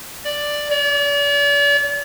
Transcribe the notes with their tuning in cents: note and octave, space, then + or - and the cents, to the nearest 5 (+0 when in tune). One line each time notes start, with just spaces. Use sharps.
D5 +5
D5 -40